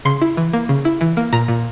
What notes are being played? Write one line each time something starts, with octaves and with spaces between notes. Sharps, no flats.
C#3 C6
E4
E3
A#3
C#3
E4
E3
A#3
A#2 A#5
A#2